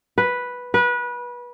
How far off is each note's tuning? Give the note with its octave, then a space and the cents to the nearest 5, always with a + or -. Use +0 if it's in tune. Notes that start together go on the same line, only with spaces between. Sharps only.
B4 -5
B4 -25